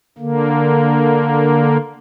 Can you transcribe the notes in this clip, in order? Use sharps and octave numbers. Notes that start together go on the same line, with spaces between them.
D3 A#3